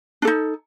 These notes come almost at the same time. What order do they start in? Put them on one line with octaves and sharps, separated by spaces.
D4 A4 D#4